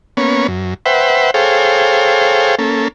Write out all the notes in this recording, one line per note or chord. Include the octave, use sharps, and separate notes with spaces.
A#3 B3 C#4 C#5
F#2
B4 C5 E5 F#5 G5
G#4 A4 C5 C#5 F5 G5
A#3 C#4 A4